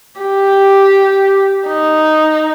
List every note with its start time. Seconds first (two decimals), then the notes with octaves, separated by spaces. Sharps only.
0.21 G4
1.68 D#4